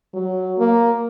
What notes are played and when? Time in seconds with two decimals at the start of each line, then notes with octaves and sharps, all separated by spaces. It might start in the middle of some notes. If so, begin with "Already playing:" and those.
0.14 F#3
0.59 A#3